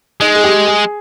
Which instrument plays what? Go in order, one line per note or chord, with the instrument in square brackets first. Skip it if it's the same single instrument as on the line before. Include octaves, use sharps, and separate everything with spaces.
[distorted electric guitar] G#3 [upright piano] D#4
[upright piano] G#4
G4
G#4